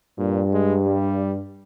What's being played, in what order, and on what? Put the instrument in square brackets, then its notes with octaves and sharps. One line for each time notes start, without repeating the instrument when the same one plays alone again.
[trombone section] G2 [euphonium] A#2
[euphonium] G#3
G3